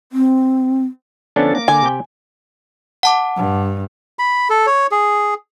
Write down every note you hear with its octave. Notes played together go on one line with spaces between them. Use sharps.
C4
D3 F3 B3 C#4 D4 A4
A#3 D6
D3 G#5
C3 G4 G5
F#5 A5 D6
G2
B5
A4
C#5
G#4